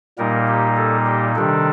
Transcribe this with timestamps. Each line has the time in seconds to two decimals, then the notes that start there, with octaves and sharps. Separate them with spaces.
0.18 A#2 G3 A#3 D#4 A#4
0.47 G4
0.77 A4
1.06 G4
1.35 C3 D#3 G3 D4 A4